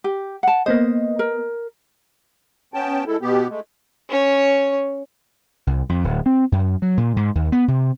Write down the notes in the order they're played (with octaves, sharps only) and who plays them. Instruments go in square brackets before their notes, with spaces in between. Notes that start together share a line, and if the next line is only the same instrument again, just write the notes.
[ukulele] G4
F#5 A5
[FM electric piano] A#3 B3 D#5 [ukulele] C5
[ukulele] A#4
[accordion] B3 C#4 G5 A5
G#3 E4 A4
B2 B3 G4
G#3 A3
[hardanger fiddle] C#4 C#5
[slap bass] C2
F2
D1
C4
F#2
F#3
A#2
G#2
D#2
B3
C3